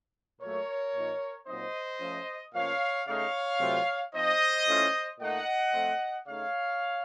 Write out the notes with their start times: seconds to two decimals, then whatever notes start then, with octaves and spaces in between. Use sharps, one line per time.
0.41 A#2 F#3 A3 A#4 C#5
0.95 A#2 F3 A#3 D#4
1.47 A#2 F#3 C4 D#4 C5 D#5
2.00 F3 A3 C#4
2.54 A#2 F3 A3 C#4 C#5 F5
3.07 C#3 A3 D#4 C#5 F5
3.60 C3 F#3 A3 C4 F4
4.14 F3 C4 D#4 C5 D#5
4.67 A2 A3 C#4 F4
5.20 A#2 A3 D#4 D#5 F#5
5.73 F3 A3 C4
6.27 C#3 A3 D#4 C#5 F5